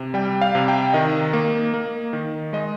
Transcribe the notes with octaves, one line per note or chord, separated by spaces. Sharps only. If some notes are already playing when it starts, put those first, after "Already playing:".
Already playing: C3
G3 G5
F5
C3
G5
D#3 D#5
A#3
A#3
D#3
G#3 D#5